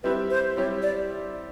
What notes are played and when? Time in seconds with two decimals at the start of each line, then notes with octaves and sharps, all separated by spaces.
0.04 G3 C4 E4 G4 B4
0.30 C5
0.57 G3 C4 E4 G4 C#5
0.82 D5